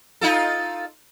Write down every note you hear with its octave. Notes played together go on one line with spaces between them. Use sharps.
D#4 F4 A4